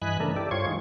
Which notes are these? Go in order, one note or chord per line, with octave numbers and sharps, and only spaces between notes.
G2 E3 D#5 G#5 B5 F#6
C#3 E3 A3 D4 A4 A#4
E4 G4 A4 D5
G2 F4 C5 C#5 C#6 G#6
E3 G3 G#3 D#4